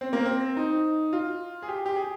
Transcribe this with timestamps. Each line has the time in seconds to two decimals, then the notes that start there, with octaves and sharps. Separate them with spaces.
0.01 C4
0.13 A#3
0.25 C4
0.57 D#4
1.13 F4
1.62 G#4
1.68 G4
1.86 G4
1.96 G#4